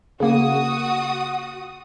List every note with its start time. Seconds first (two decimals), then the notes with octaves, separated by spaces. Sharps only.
0.20 C#3 A#3 F#4 F#5 D#6